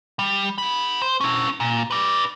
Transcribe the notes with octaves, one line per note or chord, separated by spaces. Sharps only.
G3
G#4 B5
C5
C#4 E4
A#2
B4 D5